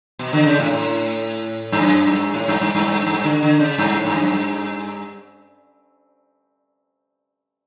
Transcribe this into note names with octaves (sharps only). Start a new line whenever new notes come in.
B2
D3
C#3
A2
A2
G2
F#2
G2
A2
G2
G2
G2
G2
G2
D3
D3
C#3
G2
A2
G2
F#2
G2